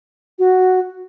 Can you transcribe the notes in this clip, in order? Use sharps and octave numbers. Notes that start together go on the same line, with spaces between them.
F#4